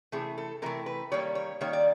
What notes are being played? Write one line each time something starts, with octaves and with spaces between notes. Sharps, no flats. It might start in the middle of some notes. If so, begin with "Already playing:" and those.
C3 E3 A3 G#4
A4
C3 E3 A3 A#4
B4
D#3 G3 A#3 C#5
C#5
D#3 G3 A#3 C#5
D5